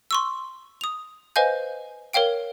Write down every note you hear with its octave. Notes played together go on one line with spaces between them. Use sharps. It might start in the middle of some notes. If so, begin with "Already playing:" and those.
C6 C#6 E6
D#6 F7
B4 C5 D#5 F5 G#5 G6
A#4 C#5 F5 G5 D7